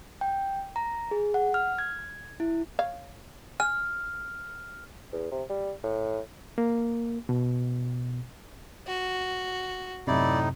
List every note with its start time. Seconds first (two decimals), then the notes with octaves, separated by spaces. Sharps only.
0.21 G5
0.76 A#5
1.11 G#4
1.34 F#5
1.54 F6
1.78 G#6
2.40 E4
2.79 C#5 F5
3.60 G#5 F6
5.13 E2
5.31 C3
5.50 G3
5.83 A2
6.58 A#3
7.29 B2
8.87 F#4
10.07 F#2 A2 C3 D#4 E4 D5